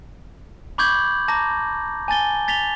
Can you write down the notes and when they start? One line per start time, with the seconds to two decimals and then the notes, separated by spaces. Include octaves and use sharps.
0.78 B5 C#6 D6 G6 G#6 F#7
1.28 A5 A#5 D6 A#6
2.08 G#5 A5 A6 G7
2.48 A6 B6 F7 G7